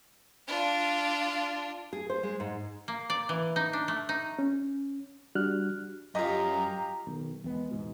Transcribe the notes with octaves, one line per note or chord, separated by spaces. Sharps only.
D4 F4
G#4
C5
G#3
G#2
A#3
D5
E3
D#4
D4
A3
D#4
C#4
G3 D4 F#4 F6 F#6
F#2 F4 G4 D#5 A#5
B1 D#3
E2 G#3 B3
E2 G#2 B2